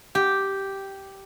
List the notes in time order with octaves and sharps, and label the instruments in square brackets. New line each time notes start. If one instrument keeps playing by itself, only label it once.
[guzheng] G4